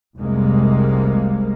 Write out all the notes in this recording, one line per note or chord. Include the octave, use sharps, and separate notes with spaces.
F1 C2 C3 G3 G#3 A#3